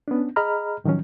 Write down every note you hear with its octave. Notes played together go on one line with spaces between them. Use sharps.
B3 C#4 D4
G#4 D#5 A#5 B5 F6
A2 D#3 F3 F#3 C#4